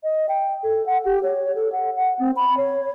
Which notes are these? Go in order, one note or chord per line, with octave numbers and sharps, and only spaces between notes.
D#5
G5
A4
F#5
G4
C#5
A4
F#5
F#5
C4
B5
C#5